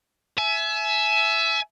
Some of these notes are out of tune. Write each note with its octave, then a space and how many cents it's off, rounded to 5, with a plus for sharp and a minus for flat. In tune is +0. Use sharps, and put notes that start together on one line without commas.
E5 +5 G#5 +35